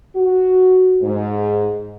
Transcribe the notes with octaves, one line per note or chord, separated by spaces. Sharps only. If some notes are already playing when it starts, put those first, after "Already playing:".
F#4
G#2